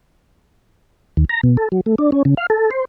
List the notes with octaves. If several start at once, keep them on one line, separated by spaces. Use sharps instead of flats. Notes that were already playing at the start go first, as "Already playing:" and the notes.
D#2
A#5
B2
A4
F#3
A3
D4
C#4
C#3
F5
A4
C5